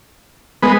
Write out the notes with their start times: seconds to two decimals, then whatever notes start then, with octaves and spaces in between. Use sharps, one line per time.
0.62 G#3 B3